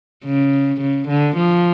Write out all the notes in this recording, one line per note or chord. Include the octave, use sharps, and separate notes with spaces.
C#3
C#3
D3
F3